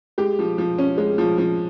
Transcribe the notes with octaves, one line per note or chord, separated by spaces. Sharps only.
G#3 G4
F3
F3
C#4
G#3
F3
F3